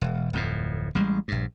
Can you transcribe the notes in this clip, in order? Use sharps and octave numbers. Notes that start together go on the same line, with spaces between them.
E1
D1 F2 A2
A1 G3 G#3
A#1 G2